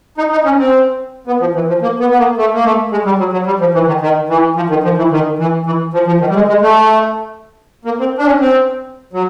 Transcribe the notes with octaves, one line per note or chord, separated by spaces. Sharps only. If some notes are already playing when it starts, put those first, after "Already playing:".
D#4
D#4
C#4
C4
B3
F3
E3
F3
A#3
B3
B3
A#3
A3
A#3
A3
G#3
G3
F#3
F#3
G3
F3
E3
D#3
D#3
E3
F3
D#3
F3
E3
D#3
E3
E3
F3
F3
D#3
G3
G#3
G#3
A3
A#3
C4
D4
C#4
C4
F#3